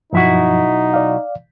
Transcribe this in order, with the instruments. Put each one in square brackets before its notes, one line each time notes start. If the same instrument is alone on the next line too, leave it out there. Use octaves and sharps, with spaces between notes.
[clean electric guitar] B1 E4 F#4 [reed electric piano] G2 F3 [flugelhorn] D#4
[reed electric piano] D5 F5